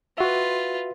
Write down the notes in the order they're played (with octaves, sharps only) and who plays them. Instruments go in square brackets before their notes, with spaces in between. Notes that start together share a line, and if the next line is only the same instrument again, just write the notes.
[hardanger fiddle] F4 B4 [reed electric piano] F#4 E5